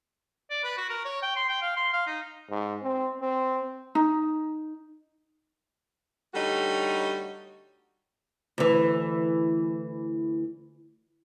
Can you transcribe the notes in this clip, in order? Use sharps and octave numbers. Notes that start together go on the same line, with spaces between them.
D5
B4
F#4
A#4
C#5
G5
C6
G5
F5
C6
F5
D#4
G#2
C4
C4
D#4
D3 G3 A3 D#4 F#4 C#5
D2 E3